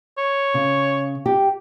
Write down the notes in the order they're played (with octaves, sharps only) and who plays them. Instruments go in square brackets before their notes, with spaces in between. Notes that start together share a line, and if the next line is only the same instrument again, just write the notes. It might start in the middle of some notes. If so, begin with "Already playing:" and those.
[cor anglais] C#5
[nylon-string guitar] C#3
G4